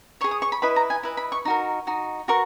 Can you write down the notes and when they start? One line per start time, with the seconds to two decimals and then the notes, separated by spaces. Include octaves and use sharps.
0.21 C#5 C#6
0.24 G#4
0.31 D#6
0.42 C#6
0.52 B5
0.62 E4 B4 D#5 B5
0.76 A#5
0.90 G#5
1.03 E4 B4 D#5
1.17 B5
1.32 C#6
1.45 D#4 F#4 A#4
1.87 D#4 F#4
2.28 F#4 A#4 C#6